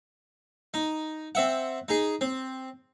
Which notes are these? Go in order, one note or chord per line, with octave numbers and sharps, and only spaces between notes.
D#4
C4 E5 F#5
D#4 G#4
C4